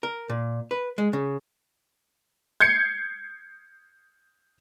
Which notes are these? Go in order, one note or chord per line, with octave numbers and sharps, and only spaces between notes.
A#4
A#2
B4
G#3
C#3
G6 G#6 C7 C#7